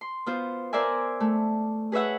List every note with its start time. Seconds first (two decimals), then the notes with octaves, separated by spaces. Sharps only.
0.01 C6
0.26 B3 F4 C5
0.73 A#4 C5 D5 E5 G#5
1.20 A3
1.92 G#4 B4 C#5 E5 F#5